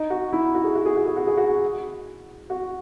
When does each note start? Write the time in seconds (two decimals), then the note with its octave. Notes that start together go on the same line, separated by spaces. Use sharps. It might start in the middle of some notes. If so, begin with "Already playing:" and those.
Already playing: D#4
0.10 F#4
0.32 E4
0.54 F#4
0.64 G#4
0.75 F#4
0.85 G#4
0.96 F#4
1.06 G#4
1.16 F#4
1.27 G#4
1.37 F#4
2.50 F#4